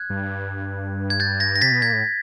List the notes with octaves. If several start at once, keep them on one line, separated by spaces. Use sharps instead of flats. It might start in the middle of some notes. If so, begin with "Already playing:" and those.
Already playing: F#6 G#6
G2
G#6
G6 A6
G#6 A#6
A#6
C3 A6 B6
B2
A#2 G#6 A#6
A2